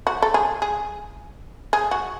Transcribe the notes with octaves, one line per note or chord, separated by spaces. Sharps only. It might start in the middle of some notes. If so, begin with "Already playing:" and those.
F#4
A4
G#4
G#4
G#4
F#4